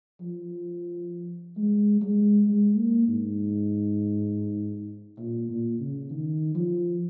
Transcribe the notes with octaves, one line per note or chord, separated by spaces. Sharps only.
F3
G#3
G#3
G#3
A#3
G#2
A#2
A#2
C#3
D#3
F3